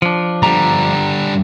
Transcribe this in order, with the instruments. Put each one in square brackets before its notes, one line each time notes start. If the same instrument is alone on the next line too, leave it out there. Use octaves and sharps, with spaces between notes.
[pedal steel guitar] F3 D4
[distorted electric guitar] D3 G3 [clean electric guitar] A#5